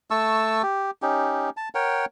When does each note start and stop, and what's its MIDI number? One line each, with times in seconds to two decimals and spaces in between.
0.11 0.62 57
0.11 0.62 81
0.11 0.62 85
0.11 0.62 88
0.63 0.91 67
1.02 1.50 61
1.02 1.50 63
1.02 1.50 67
1.57 1.69 81
1.75 2.05 70
1.75 2.05 73
1.75 2.05 78
1.75 2.05 79